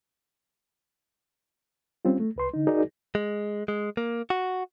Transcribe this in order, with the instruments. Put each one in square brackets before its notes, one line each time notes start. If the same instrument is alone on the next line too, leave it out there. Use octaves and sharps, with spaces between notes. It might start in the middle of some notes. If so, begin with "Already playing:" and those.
[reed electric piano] G3 C4 C#4 F4
A3
C2 B4 C6
D3 D#4
D#4 F#4 G#4 A#4 D5
[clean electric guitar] G#3
G#3
A#3
F#4